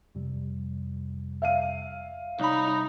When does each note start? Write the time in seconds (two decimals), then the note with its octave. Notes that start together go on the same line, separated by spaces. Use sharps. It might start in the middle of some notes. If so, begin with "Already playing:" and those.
0.15 F2 C3 G3
1.42 E5 F5 D#7
2.40 C2 D#4 C#5 D5 B5